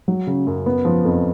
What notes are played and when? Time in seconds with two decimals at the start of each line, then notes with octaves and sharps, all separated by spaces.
0.08 F#3
0.27 C#3
0.47 F#2
0.66 B3
0.85 F3
1.05 F2